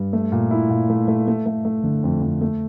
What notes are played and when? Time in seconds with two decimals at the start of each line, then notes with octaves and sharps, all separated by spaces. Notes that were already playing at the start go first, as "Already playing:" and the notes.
Already playing: G2
0.13 A3
0.32 A#2
0.51 E4
0.70 A#2
0.90 A3
1.08 A3
1.28 A3
1.46 A3
1.65 A3
1.84 D3
2.04 F2
2.22 F2
2.41 A3